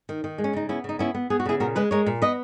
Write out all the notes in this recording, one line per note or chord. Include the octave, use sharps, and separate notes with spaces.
D#3
D#3
G#3
C#4
C#3 D#4
B3 C#4 E4
C#3 D#4
B3 C#4 E4
B3
B3 G#4
F#4
C#3 E4 G#4
A#2 F#4 A#4
G#3 G#4 B4
G#3 A#4 C#5
A#2
B3 B4 D#5